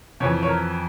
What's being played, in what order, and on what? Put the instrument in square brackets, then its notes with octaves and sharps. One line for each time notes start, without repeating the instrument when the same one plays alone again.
[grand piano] F2 C#5
E3
C#5
A#4